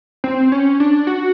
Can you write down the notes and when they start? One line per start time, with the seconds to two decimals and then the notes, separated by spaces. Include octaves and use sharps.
0.24 C4
0.52 C#4
0.80 D4
1.07 F#4